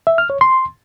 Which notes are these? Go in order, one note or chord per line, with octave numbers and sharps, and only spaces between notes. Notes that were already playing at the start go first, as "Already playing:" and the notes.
E5
F6
C#5
C6